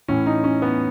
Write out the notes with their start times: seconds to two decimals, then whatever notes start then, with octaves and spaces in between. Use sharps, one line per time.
0.08 A2 E3 C#4
0.26 D#4
0.44 C#4
0.62 B3